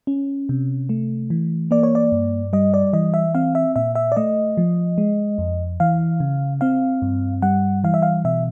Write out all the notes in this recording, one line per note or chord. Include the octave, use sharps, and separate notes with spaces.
C#4
C3
A3
E3
A#3 D5
C#5
D5
G2
G3 D#5
D5
E3 D#5
E5
C4 F5
E5
A#2 E5
E5
D5
A3 D#5
F3
G#3
F2
E3 F5
C#3
C4 F5
G2
G3 F#5
E3 F5
E5
F5
B2 E5